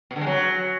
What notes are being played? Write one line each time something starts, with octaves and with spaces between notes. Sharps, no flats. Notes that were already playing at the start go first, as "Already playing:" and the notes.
B2
D3
G#3
F#3